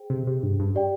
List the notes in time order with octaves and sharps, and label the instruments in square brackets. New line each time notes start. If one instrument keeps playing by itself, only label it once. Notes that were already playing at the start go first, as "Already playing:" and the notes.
Already playing: [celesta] G#4 C5 G5
[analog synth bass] C3
C3
G2
G2
[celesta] G4 D5 G5